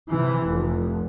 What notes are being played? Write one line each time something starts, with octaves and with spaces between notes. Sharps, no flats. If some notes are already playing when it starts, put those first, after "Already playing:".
C3 E3
F1